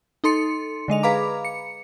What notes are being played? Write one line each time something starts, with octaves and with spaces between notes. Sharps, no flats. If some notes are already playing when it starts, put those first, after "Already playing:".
D#4 A4 C6 C#7
D3 G#3 D#5 F7
G#4 B4 F5 A#5 B5 D6
C#7